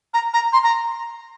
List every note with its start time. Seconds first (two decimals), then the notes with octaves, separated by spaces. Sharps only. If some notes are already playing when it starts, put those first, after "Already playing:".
0.14 A#5
0.34 A#5
0.53 C6
0.63 A#5